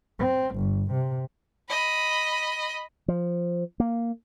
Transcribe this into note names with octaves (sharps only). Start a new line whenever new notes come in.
C4
G1
C3
D#5 B5
F3
A#3